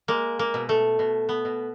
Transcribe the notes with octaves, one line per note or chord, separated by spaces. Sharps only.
G#3 A#3
A#3
B2
A3
B2
B3
B2